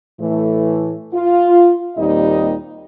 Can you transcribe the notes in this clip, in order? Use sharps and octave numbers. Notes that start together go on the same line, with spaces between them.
A2 E3 A3
F4
D#2 A#2 G3 C4 D#4 D#5